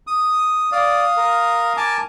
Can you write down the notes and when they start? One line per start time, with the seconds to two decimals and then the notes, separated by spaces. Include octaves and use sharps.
0.07 D#6
0.72 D5 F5 D#6
1.17 A#4
1.77 G#5 A5 D6